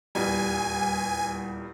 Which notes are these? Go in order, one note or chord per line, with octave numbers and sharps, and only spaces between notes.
D#1 E2 G3 G#5